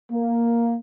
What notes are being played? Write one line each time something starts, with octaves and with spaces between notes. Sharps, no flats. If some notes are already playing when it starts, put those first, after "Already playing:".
A#3